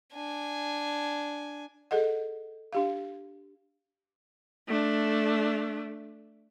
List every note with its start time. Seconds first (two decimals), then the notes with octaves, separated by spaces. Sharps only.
0.14 D4 G#5
1.91 G#4 A4 D#5 F#5
2.73 D4 G4 F5
4.68 A3 D4